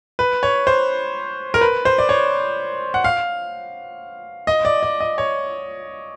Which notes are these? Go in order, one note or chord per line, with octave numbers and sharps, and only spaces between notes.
B4
C#5
C5
A#4
B4
C5
D5
C#5
F#5
F5
D#5
D5
D5
D#5
C#5